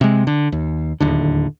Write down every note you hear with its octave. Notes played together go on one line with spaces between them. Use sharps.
C3 G#3
D3
D#2
D1 D#2 D3